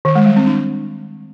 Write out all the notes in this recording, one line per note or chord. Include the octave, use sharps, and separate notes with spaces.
D#3
G#3
G3
C4
D4